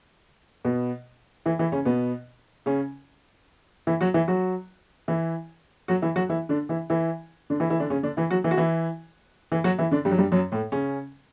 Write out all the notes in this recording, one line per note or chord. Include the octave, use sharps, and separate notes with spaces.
B2 B3
E3 E4
E3 E4
C#3 C#4
B2 B3
C#3 C#4
E3 E4
F#3 F#4
E3 E4
F#3 F#4
E3 E4
F#3 F#4
E3 E4
F#3 F#4
E3 E4
D3 D4
E3 E4
E3 E4
D3 D4
E3 E4
E3 E4
D3 D4
C#3 C#4
D3 D4
E3 E4
F#3 F#4
E3 E4
F#4
E3 E4
E3 E4
F#3 F#4
E3 E4
D3 D4
G2 G3
F#3
G2 G3
F#2 F#3
A2 A3
C#3 C#4